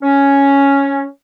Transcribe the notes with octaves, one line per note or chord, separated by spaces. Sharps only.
C#4